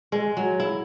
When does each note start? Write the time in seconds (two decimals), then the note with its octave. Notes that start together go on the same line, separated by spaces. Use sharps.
0.12 G#3
0.37 F#3
0.60 E4